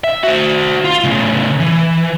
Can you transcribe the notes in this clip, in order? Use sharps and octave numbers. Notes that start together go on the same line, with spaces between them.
E5
F#4 C5
F4
A2 C#3
E3